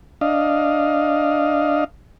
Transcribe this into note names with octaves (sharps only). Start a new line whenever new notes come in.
D4 D#5 F5